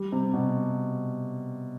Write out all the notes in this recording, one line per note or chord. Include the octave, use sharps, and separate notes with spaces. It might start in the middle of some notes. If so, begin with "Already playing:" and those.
Already playing: G3
C3
B2